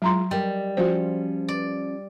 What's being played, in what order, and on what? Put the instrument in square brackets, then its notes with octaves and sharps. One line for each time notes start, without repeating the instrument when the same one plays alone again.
[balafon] F#3 A#5 C6 [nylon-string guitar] G#3 E4 F4
[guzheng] G3 [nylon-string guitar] G4 A#4 D#5
[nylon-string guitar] F3 C#4 F4 [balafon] F#4 C5
[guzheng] D5